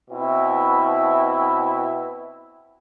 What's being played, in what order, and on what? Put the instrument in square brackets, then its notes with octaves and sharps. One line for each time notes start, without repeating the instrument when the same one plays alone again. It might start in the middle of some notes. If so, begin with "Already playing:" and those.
[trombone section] B2 C4 E4